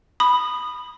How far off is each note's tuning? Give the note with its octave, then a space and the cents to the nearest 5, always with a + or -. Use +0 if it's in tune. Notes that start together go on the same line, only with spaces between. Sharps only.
B5 +0 D#6 -20